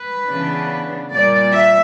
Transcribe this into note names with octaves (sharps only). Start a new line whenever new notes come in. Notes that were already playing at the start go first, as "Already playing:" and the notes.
Already playing: B4
C#3 E3 B3 D4
A#2 G3 A#3 D5
E5